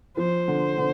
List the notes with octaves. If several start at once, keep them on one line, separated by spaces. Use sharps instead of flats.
F3 C5
D3
D3